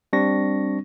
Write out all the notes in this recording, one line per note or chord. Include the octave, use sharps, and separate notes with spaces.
G3 C4 D4 C#6 A#6